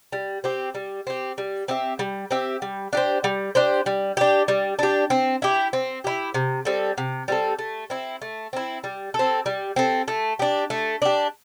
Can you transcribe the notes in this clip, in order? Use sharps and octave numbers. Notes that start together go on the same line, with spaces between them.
G3
C4 G4
G3
C4 G4
G3
C4 G4 E5
G3
C4 G4 E5
G3
D4 G4 C5
G3
D4 G4 C5
G3
D4 G4
G3
D4 G4
C4
E4 G4
C4
E4 G4
C3
G3 C4 A4
C3
G3 C4 A4
A3
C4 E4
A3
C4 E4
G3
A4
C4
G3
C4 A4
A3
D4 G4
A3
D4 G4